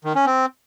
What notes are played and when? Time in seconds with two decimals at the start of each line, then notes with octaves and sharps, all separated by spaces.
0.05 D#3
0.15 C#4
0.26 C4